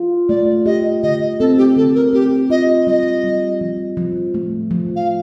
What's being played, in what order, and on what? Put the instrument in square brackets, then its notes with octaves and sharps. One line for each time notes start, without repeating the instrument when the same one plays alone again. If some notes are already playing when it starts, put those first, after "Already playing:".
Already playing: [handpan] F4
[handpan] A3 [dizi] D5
[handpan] G4 [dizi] D#5
[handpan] D3 [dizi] D#5
[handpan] C4 [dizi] A4
[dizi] G4
[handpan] D3 [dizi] A4
[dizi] A#4
[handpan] C4 [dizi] G4
[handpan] F4 [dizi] D#5
[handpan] G3 [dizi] D#5
[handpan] G3
F3
F3
A3
F3
[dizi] F5